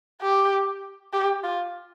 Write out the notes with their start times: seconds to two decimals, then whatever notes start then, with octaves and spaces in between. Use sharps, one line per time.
0.22 G4
1.13 G4
1.44 F4